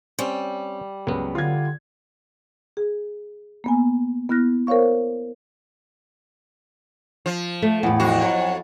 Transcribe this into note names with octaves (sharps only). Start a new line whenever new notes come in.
G3 C4 C#4 C5
C#2 F#3 B3
D3 F4 G#6
G#4
A#3 B3 G#5
B3 E4 F6 F#6 A#6
A#4 C5 C#5 F5 C#6
F3
A3
E2 A2
F2 F#4
F#3